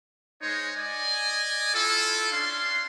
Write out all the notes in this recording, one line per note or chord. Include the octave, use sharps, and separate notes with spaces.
G#3 D#4 C5 C#5 A#5
D5 D#5 G#5
E4 F4 A4
C#4 D4 F5 C6